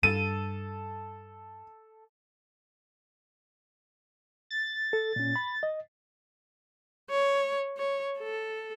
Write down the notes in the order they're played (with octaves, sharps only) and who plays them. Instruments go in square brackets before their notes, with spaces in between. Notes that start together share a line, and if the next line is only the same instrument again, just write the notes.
[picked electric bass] G2 [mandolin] A4 [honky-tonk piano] D#7
[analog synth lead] A6
[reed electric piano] A4
A#2 C#4
B5
D#5
[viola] C#5
C#5
A4